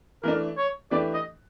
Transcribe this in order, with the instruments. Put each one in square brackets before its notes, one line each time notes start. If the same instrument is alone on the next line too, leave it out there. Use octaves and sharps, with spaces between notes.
[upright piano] E3 A3 D4 [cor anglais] A#4
[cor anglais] C#5
[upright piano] E3 A3 D4 G4 B4 [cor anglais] D5
[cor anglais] D#5